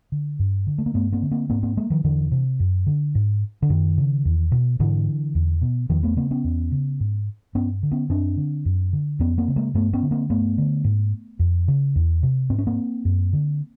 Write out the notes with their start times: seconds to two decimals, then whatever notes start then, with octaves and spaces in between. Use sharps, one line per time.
0.12 D3
0.39 G2
0.67 D3
0.78 A3
0.86 A#3
0.94 G2 A3 B3
1.12 A#3 C4
1.22 D3
1.31 A#3 C4
1.50 G#2 A#3 C4
1.63 A#3 C4
1.77 G#3 A#3
1.90 D#3 F3
2.04 E2 D3 E3
2.32 C3
2.60 F#2
2.87 D3
3.15 G#2
3.62 D3
3.70 F#2 D#3
3.98 C#3
4.25 E2
4.52 B2
4.80 G#2 D3 E3
5.35 E2
5.62 B2
5.90 E2 D#3 F3
6.03 A3 B3
6.17 C#3 A#3 C4
6.31 B3 C#4
6.44 E2
6.72 C#3
7.00 G#2
7.55 G2 B3 C#4
7.83 D3
7.92 B3 C#4
8.09 F#2 C4 D4
8.37 D3
8.65 F#2
8.93 D3
9.19 F2 B3 C#4
9.38 A#3 C4
9.48 C#3
9.56 G#3 A#3
9.74 G2 A3 B3
9.93 B3 C#4
10.03 D3
10.11 A#3 C4
10.30 G2 A3 B3
10.58 D3
10.84 G#2
11.39 F2
11.68 C#3
11.96 E2
12.23 C3
12.50 G#2 C4
12.58 C#4
12.67 A#3 C4
13.05 F#2
13.33 D3